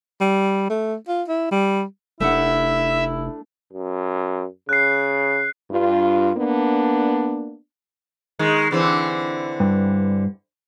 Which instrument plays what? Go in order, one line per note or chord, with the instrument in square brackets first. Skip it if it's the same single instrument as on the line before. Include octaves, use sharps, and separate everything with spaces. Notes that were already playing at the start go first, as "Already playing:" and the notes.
[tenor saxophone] G3
A3
F4
E4
G3
[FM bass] F1 [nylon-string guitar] A3 D4 F#5 [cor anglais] E4 [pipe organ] E5
[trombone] F#2
[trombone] C#3 [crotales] F#6 C7
[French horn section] G2 F4
A#3 B3 D4
[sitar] D#3 G#3
D3 E3 C4
[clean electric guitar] G2